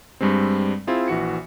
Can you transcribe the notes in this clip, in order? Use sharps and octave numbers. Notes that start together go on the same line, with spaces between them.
G2 G3 G#3 C4
C4 E4 F4 G#4
A#1 E3 F#4 C#7